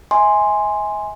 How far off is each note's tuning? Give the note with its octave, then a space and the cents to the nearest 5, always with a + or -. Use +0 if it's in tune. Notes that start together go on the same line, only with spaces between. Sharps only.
E5 -45 G#5 +0 C6 +0